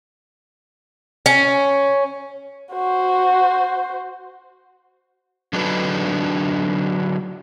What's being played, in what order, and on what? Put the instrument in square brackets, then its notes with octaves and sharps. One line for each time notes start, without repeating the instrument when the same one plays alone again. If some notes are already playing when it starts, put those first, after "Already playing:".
[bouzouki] C#4
[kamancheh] F#4 C5
[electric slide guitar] D3 F#3 D4 D#4 F#4 B4